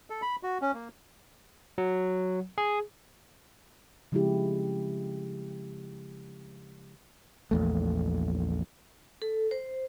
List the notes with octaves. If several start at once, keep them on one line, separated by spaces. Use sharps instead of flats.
A4
B5
F#4
C#4
A#3
F#3
G#4
C#3 F3 G#3 C4 E4 G4
A#1 E2 A3
A4
C5